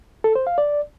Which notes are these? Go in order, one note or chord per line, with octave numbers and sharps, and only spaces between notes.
A4
C5
F5
D5